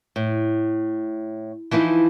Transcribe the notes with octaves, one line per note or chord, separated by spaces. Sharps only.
A2
E3 F3 D#4 E4